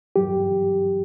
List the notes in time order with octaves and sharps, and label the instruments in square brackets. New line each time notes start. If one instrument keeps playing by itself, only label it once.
[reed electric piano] G2 F#3 G4